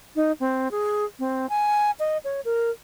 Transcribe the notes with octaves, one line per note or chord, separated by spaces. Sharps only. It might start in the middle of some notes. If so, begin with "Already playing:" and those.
D#4
C4
G#4
C4
G#5
D#5
C#5
A#4